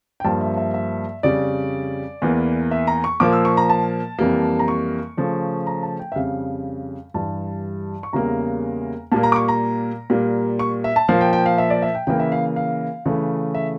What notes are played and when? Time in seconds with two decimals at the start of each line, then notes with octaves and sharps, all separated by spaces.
0.20 G5
0.25 G2 F3 A#3 A5
0.41 E5
0.57 E5
0.74 E5
1.23 F2 C#3 G3 D5
2.22 E2 E3 A#3
2.71 E5
2.87 A#5
3.04 C#6
3.20 A#2 F3 A#3 D6
3.33 E6
3.45 C#6
3.57 A#5
3.70 A5
4.19 F2 E3 G3 A#3
4.59 A#5
4.68 C#6
5.17 C#3 F3 A3
5.67 A#5
5.83 A5
5.99 G5
6.12 E5
6.16 F2 C#3 G3 F5
7.14 G2 E3 G3 A5
8.03 C#6
8.13 E2 C#3 G3 A#3 A#5
9.12 A#2 G3 A#3 A5
9.23 A#5
9.32 D6
9.36 C#6
9.48 A#5
10.10 A#2 G3 A#3
10.59 C#6
10.84 E5
10.96 A5
11.09 A#2 F3 A#3 F5
11.21 G5
11.33 G5
11.46 F5
11.58 E5
11.70 D5
11.82 E5
11.95 G5
12.07 C#3 E3 A#3 G5
12.19 E5
12.32 F5
12.56 F5
13.06 C#3 E3 A3
13.55 E5